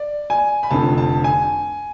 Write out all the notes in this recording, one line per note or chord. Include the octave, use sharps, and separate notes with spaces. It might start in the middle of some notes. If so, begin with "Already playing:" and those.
Already playing: D5
G#5
B5
F1 F2 D3 A5
A5
G#5